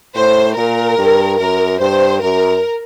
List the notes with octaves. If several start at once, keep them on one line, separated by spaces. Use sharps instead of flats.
A2 C5
A#2 A#4
G2
F#2 A#4
G2 C5
F#2 A#4